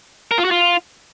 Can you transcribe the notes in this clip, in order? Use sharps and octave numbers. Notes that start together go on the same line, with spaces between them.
A#4
F4
F#4
F4